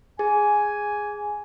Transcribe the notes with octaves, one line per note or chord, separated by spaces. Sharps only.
G#4 G#5